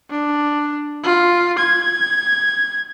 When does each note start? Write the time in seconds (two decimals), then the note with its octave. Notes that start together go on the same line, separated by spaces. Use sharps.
0.10 D4
1.04 F4
1.58 G#6